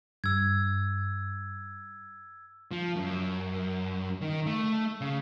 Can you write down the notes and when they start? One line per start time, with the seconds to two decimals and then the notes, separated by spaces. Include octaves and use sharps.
0.24 G2 E6 G#6
2.71 F3
2.96 F#2
4.21 D#3
4.46 A3
5.01 C#3